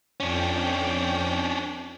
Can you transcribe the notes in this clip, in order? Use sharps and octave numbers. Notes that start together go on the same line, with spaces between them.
F2 C#4 D4 G5